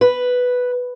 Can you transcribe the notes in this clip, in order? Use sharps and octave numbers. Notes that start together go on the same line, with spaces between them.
B4